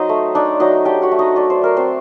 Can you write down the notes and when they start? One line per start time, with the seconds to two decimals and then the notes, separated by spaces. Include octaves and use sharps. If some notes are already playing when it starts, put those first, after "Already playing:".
Already playing: F#3 D#4 C5 D#5
0.09 A3
0.35 D4 D#4 D5
0.60 F#3 D#4 D#5
0.85 D4 G4 G5
1.02 F#4 F#5
1.12 A3
1.19 D#4 D#5
1.36 A3 D5
1.50 C5
1.62 A3 A#4
1.77 C4 C5